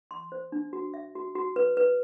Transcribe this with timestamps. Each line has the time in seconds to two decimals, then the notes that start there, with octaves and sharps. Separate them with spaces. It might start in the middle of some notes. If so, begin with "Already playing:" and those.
0.11 C6
0.32 C5
0.52 D4
0.73 F#4
0.94 E5
1.15 F#4
1.35 F#4
1.56 B4
1.77 B4